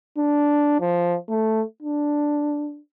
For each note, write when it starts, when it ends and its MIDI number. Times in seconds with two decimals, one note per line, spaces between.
0.18 0.78 62
0.80 1.16 53
1.29 1.61 57
1.82 2.79 62